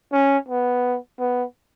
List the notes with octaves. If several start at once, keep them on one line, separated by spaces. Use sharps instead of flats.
C#4
B3
B3